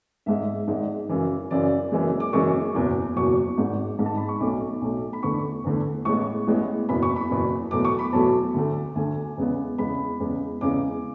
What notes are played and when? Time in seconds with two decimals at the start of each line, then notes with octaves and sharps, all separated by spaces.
0.26 G#1 G#2 G#3 E5
0.68 G#1 G#2 G#3
1.09 F#2 C#3 E3
1.51 F#2 C#3 E3 D5
1.92 F#1 F#2 E3 G#3
2.20 D6
2.33 F#1 F#2 E3 G#3 C#6
2.74 F#1 E2 B2 F#3
3.16 F#1 E2 B2 F#3 C#6
3.57 G#1 G#2 G#3
3.99 G#1 G#2 G#3
4.06 A5
4.17 B5
4.29 C#6
4.40 B1 B2 A3 D6
4.81 B1 B2 A3
5.13 B5
5.23 E2 D3 A3 C#6
5.64 E2 D3 A3
6.05 A1 A2 G#3 B3 C#6
6.47 A1 A2 G#3 B3
6.89 F#1 E2 B2 B5
7.02 C#6
7.16 B5
7.30 F#1 E2 B2
7.71 E2 B2 F#3 A3 D6
7.85 C#6
7.99 B5
8.13 E2 B2 F#3 A3 A5
8.54 D2 D3 A3
8.95 D2 D3 A3 G#5
9.37 E2 C#3 G#3 B3
9.78 E2 C#3 G#3 B3 B5
10.20 E2 C#3 G#3
10.61 E2 C#3 G#3 D6